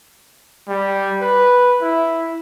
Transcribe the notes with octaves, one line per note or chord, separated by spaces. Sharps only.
G3
B4
E4